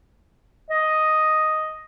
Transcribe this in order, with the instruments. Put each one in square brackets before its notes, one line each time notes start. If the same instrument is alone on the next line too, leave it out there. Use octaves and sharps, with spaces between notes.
[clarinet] D#5